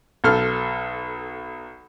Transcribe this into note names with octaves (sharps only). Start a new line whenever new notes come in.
B1 A4 F6